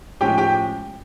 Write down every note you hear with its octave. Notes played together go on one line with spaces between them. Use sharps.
A2 F3 G#3 C#4 G4 G5
G4 G5